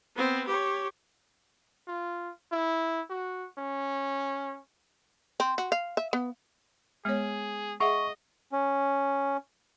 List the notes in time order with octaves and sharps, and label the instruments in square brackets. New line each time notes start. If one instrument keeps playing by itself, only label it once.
[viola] B3 C4
G4 C#5
[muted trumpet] F4
E4
F#4
C#4
[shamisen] C4
F#4
F5
E5
B3
[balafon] G#3 B3 C#5 [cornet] G#4
[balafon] G#4 E5 F#5 [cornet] D#5 [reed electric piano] C#6
[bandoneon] C#4